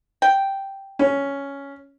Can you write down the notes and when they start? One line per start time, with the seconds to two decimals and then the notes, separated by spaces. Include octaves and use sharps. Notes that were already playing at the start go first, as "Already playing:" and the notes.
0.22 G5
0.99 C#4